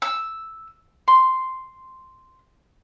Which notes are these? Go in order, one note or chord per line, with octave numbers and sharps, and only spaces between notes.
E6
C6